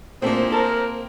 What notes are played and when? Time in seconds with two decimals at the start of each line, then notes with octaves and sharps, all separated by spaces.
0.22 A#2 A3 A#3 C4 D4 E4 G#4 C5
0.52 A4 A#4